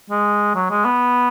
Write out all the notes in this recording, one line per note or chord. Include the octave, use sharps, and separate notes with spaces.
G#3
F#3
G#3
B3